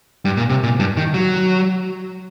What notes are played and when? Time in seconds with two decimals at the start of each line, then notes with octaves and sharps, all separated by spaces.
0.25 G2
0.37 A#2
0.49 C3
0.63 A#2
0.79 G2
0.97 D#3
1.14 F#3